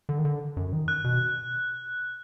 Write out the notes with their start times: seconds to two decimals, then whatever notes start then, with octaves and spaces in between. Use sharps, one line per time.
0.09 D3
0.18 D#3
0.25 D3
0.57 F#2
0.73 D#3
0.88 F#6
1.04 B2